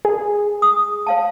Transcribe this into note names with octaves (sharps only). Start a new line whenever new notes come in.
G#4
D#6
C#5 F5 A5